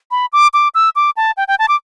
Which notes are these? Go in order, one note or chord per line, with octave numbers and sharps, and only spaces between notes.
B5
D6
D6
E6
D6
A5
G5
G5
A5
D6